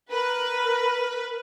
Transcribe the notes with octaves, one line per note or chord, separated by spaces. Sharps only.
A#4 B4